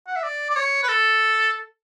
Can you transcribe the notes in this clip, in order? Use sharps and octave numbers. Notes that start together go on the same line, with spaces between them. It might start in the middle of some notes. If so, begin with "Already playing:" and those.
F#5
E5
D5
D5
C#5
B4
A4